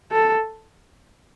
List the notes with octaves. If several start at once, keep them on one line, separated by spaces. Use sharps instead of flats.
A4